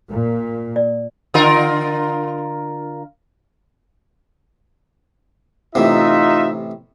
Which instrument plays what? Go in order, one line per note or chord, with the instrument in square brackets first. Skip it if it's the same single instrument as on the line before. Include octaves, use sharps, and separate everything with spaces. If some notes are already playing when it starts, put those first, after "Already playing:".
[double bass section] A#2
[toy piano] D5
[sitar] D3 F4 A#4
[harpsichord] A1 C3 [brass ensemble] D#4 F4 E5